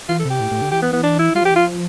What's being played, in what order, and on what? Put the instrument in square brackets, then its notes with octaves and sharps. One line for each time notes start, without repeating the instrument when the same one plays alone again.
[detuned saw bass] E3 [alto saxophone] F4
[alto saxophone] A4
[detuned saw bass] C3
[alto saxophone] G4
[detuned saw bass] A2
A2
D3
[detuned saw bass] E3 [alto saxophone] G4
[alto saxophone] B3
B3
D4
E4
[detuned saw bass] G3 [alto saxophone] F4
[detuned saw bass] F3
[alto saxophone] G4
[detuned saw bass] E3
[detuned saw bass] F3 [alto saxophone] F4